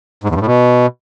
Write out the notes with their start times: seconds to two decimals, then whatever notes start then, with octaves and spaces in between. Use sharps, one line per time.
0.24 G#2
0.29 E2
0.35 G2
0.41 A2
0.46 B2